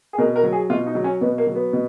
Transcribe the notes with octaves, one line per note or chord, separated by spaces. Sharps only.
G#4
B2 A#4
A#4
F#3
G#4
B2 F4
D#4
F#3
C#4
B2 B3
A#3
F#3
B3
B2